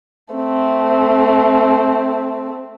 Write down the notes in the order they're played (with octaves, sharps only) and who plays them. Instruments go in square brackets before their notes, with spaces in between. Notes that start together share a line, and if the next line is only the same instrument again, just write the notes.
[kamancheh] A3 C4